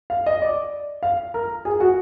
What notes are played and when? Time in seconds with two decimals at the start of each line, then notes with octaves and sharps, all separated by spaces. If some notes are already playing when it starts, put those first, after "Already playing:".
0.10 F5
0.26 D#5
0.42 D5
1.03 F5
1.34 A#4
1.65 G#4
1.80 F#4